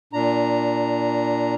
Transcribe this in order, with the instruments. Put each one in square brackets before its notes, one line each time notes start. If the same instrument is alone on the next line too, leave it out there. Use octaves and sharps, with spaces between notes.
[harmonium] A#2 D4 A#5